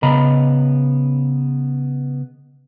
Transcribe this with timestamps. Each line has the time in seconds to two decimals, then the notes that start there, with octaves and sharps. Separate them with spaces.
0.03 C#3 B3 D#5 A#5 B5